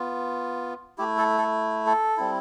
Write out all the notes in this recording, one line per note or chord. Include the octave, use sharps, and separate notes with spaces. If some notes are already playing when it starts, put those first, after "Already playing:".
Already playing: B3 F4
A3 E4 G4
A4
A4
A4
G3 C4 E4